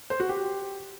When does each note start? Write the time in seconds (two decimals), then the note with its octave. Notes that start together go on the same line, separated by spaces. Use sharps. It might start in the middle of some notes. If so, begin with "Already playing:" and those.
0.10 C5
0.20 F#4
0.29 G4